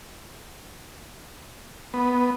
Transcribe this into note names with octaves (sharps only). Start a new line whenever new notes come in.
B3